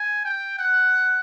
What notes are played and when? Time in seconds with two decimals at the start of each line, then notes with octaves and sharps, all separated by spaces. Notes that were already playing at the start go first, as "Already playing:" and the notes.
Already playing: G#5
0.25 G5
0.59 F#5